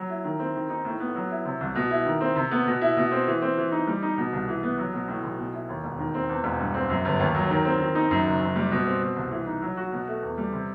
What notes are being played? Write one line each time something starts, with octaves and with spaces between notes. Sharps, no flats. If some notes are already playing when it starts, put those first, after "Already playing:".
Already playing: F#3
E4
D#3
C4
D#3
D#4
A2
B3
F#3
E4
C3
C2
B2
E4
D#3
C4
C3
B3
B2
E4
B2
C4
E3
C4
E3
D#4
G3
D#4
B2
C2
E3
B3
F#3
B2
A2
B1
B2
E4
D#2
E1
D#3
C4
E2
E1
G2
C4
F#2
G1
D#2
F#3
D#3
C4
D#3
D#4
F#2
F#1
F#2
G3
B2
C4
B2
C2
E3
D#4
F#3
F#4
B2
A3
E2
G3
C3